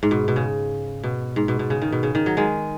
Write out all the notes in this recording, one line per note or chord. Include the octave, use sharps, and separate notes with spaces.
G#2
B2
B2
C#3
B2
G#2
B2
B2
C#3
D#3
B2
C#3
D#3
F#3
D#3 G#3